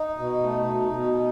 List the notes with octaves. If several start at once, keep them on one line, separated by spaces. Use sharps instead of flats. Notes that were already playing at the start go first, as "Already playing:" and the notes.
Already playing: D#4
B2
A3
B2
B2